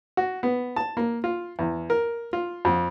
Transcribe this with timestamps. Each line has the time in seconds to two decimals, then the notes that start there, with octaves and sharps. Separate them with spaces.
0.17 F#4
0.43 B3
0.76 A5
0.97 A#3
1.24 F4
1.59 E2
1.90 A#4
2.33 F4
2.65 F2